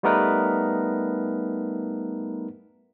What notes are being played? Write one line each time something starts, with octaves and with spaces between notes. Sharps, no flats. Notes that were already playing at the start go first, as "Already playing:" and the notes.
G3 A3 B3 D#4 A#4 B4